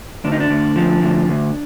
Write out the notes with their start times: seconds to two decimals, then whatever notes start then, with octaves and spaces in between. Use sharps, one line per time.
0.25 D2 D4
0.32 D#4
0.40 D4
0.50 D2
0.76 F3
1.02 D2
1.28 D2